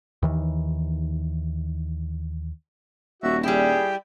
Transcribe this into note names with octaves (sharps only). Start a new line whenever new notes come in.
D#2 D#3 E3
D#1 F#4 E5
G3 E4 G4 G#4 G5